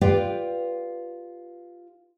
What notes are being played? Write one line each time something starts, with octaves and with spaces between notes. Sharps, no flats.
F4 G4 B4 D5 F5 G5